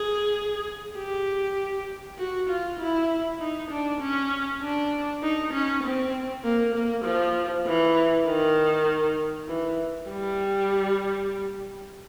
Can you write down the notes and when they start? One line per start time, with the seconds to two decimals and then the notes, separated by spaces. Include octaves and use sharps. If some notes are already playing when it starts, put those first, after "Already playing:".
Already playing: G#4
0.97 G4
2.18 F#4
2.49 F4
2.80 E4
3.40 D#4
3.70 D4
4.00 C#4
4.62 D4
5.22 D#4
5.53 C#4
5.84 C4
6.44 A#3
6.74 A#3
7.05 F3
7.66 E3
8.26 D#3
9.48 E3
10.09 G3